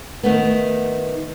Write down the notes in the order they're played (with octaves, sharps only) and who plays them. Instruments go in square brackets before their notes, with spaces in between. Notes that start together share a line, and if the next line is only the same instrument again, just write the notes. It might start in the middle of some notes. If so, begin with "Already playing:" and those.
[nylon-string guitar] D#3 A3 B3